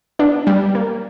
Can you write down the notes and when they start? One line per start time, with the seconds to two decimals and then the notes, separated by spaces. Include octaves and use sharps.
0.19 B3 D4
0.47 G3
0.75 A#3